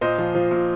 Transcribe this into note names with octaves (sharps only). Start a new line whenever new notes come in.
A#2 C5 D#5
F3
F3
A#2